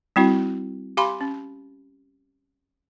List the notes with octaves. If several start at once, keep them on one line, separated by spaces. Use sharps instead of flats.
G3 C4 E4 F#4
G4 F5 G#5 B5 C6
C#4